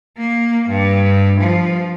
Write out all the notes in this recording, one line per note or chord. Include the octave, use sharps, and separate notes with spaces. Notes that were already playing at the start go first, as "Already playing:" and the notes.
A#3
G2
F3